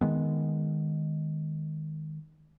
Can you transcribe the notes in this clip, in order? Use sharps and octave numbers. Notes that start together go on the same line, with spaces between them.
D#3 G#3 B3